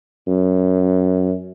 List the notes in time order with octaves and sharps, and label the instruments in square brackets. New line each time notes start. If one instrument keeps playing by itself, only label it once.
[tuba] F#2